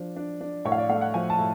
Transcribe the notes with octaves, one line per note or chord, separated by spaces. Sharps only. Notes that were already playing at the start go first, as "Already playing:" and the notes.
Already playing: F3 D4
D4
D4
A2 C#5
F5
D5
A3 F5
F#5
F3 G#5
A5
A2